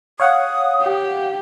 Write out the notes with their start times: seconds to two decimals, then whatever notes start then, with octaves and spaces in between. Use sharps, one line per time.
0.20 C#5 F5 F#5 D#6
0.82 G4